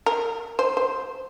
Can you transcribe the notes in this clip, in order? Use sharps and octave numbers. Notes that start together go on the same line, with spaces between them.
A#4
C5
C5